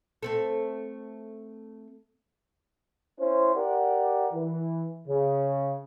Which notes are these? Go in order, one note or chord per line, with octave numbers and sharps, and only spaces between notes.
A3 C4 A4
C#4 E4 C5
G4 A#4 D5 F#5
E3
C#3